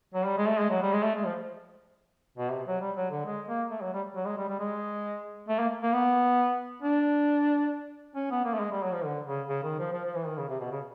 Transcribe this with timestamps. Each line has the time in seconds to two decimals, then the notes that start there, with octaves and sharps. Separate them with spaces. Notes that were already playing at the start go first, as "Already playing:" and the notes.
0.14 F#3
0.25 G3
0.37 G#3
0.48 A3
0.59 G#3
0.70 F#3
0.82 G3
0.93 G#3
1.04 A3
1.15 G#3
1.25 F3
2.38 B2
2.51 C3
2.67 F#3
2.81 G3
2.97 F#3
3.11 D3
3.26 G#3
3.48 A#3
3.70 A3
3.81 F#3
3.93 G3
4.16 F#3
4.26 G#3
4.38 G3
4.49 G3
4.59 G#3
5.48 A3
5.59 A#3
5.82 A#3
5.93 B3
6.82 D4
8.16 C#4
8.31 B3
8.45 A#3
8.54 A3
8.59 G#3
8.71 G3
8.83 F#3
8.93 F3
9.04 D3
9.27 C#3
9.49 C#3
9.64 D#3
9.79 F3
9.93 F3
10.05 F3
10.15 E3
10.26 D#3
10.37 C#3
10.49 C3
10.60 B2
10.72 C#3